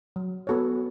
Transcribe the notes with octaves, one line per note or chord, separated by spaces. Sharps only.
F#3
B3 F#4 A4 C#5